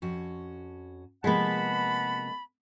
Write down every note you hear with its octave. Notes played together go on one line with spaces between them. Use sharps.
F2 C#4 F#4
C3 F3 G#3 A#3 B3 F#5 A5 B5